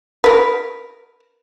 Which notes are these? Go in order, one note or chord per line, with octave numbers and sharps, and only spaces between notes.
A#4 B4